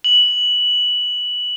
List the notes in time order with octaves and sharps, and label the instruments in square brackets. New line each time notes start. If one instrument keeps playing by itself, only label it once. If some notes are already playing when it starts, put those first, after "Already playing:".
[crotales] F#7